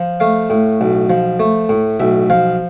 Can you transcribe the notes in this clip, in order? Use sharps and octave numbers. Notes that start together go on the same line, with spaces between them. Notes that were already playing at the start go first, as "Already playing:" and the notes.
Already playing: F3
A3 F5
A2
B1
F3
A3
A2
B1 E5
F3 F5